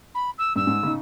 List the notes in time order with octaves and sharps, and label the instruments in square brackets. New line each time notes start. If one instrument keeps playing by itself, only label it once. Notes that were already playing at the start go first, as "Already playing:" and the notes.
[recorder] B5
E6
[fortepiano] G2 [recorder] E6
[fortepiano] G#2
C#3 D#4